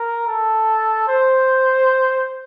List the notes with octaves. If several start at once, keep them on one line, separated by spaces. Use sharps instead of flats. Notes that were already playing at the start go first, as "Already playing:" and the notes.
Already playing: A#4
A4
C5